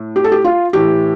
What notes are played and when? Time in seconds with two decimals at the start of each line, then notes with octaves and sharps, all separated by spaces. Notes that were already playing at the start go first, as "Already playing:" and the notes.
Already playing: A2
0.16 G4
0.24 A4
0.32 G4
0.44 F4
0.73 A2 E3 G4